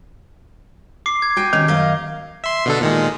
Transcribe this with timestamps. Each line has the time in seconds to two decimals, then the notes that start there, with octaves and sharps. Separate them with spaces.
1.06 D6 C7
1.22 G#6
1.36 F#4 G5 G#5
1.53 C3 D#3 C#4
1.68 F#2 D#5 F5
2.44 E5 C6
2.65 B2 D3 A4
2.81 A#2 D#3 G#3